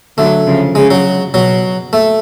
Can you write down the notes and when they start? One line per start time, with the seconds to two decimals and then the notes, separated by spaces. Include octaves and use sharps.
0.17 D3 F#3 A3
0.46 C#3 F3
0.75 C#3 G#3
0.91 F#3
1.34 B2 F#3
1.93 A3